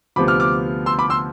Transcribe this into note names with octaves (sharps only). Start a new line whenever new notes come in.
D2 C3 F3 B3 B5 D6
D6 F6
D6 F6
C6 E6
B5 D6
C6 E6